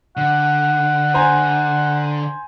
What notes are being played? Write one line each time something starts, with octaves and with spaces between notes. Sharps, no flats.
D3 F#5
C5 G#5 A#5